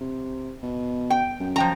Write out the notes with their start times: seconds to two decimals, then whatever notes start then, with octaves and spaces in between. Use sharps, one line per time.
0.01 C3
0.63 B2
1.10 G5
1.40 F#2
1.56 F3 G5 A#5